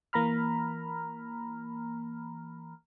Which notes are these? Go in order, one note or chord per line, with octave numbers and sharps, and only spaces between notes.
E3 A#3 A#5 B5 F6